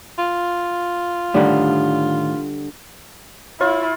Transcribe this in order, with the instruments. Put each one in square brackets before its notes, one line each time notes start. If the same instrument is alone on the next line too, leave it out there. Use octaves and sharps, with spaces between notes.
[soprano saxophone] F4
[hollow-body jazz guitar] A2 D#3 [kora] D3 G3
[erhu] E4 [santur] F4 [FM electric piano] C#5